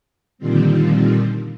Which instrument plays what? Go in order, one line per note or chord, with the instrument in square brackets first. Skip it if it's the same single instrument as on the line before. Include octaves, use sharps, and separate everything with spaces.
[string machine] A#2 D3 D#3 F3 G3 C4